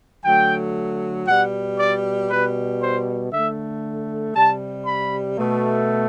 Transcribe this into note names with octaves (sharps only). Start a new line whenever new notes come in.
D3 F#3 A3 G5
B2 G3 F#5
D5
B2 G3 B4
C5
D3 A3 E5
C3 G3 A5
B5
B2 A3